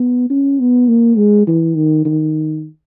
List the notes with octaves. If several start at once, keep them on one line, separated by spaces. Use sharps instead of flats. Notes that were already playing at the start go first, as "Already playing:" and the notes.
Already playing: B3
C#4
B3
A#3
G#3
E3
D#3
D#3